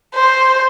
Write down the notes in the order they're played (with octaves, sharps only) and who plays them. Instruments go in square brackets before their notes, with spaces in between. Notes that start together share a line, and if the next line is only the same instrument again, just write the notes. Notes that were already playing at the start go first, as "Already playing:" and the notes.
[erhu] C5